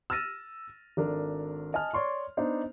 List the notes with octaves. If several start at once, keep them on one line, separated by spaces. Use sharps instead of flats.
E6 F6 A6 A#6 D#7 E7
G#1 D4 A4 A#4
D#5 G#5 A5 F6
C#5 D5 C6 C#6
B3 D4 D#4 C5